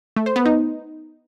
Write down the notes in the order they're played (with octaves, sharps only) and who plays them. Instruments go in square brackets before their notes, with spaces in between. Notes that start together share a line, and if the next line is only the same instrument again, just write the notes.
[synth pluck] A3
C5
B3
D#4